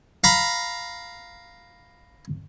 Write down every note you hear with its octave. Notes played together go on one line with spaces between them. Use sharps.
F5 A#5 B5